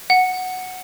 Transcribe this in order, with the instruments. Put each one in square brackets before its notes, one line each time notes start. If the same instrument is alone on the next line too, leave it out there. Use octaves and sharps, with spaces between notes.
[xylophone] F#5